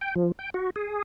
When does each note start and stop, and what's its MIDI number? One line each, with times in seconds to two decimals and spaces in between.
0.01 0.14 79
0.16 0.32 53
0.39 0.50 79
0.54 0.70 66
0.76 1.02 68